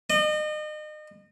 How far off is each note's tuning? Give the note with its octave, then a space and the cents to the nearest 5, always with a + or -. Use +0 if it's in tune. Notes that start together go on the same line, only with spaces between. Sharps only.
D#5 -35